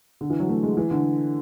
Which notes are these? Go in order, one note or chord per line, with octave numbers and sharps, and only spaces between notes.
D3
E3
F#3
A3
G#3
E3
D3